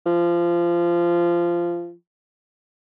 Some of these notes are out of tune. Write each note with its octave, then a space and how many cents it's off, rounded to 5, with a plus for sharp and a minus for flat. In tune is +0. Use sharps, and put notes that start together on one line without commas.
F3 -20